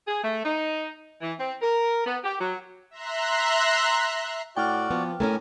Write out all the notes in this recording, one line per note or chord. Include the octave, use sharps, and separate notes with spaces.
G#4
A3
D#4
E3
C4
A#4
B3
G4
F#3
E5 A#5 C6 F#6
A2 F#4 D5 G5 D6 F6
F3 B3
A2 A3 B3 C#4 A#4 G#5